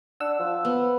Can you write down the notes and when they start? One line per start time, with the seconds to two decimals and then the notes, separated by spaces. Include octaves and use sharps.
0.20 D4 F#5 E6
0.40 F3
0.65 B3